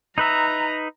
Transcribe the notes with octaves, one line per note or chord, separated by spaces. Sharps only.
D#4 B4 E5 A#5